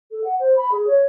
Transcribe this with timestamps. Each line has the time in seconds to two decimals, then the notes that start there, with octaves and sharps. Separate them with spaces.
0.11 A4
0.24 F#5
0.39 C5
0.56 B5
0.71 G#4
0.87 C#5